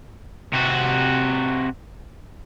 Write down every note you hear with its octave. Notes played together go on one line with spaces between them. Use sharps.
C3 F#4